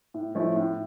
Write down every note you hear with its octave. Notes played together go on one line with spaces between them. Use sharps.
A2
F3 A3 C#4 E4
A2